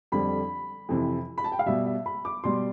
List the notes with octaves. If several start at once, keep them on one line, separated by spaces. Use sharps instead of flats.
F2 D3 G3 B5
F2 C3 E3
B5
A5
G5
F5
B2 G3 E5
E5
B5
D6
B2 G3 C6